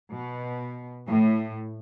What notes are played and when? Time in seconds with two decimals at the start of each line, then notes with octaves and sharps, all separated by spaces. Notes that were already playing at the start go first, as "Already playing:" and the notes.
0.13 B2
1.08 A2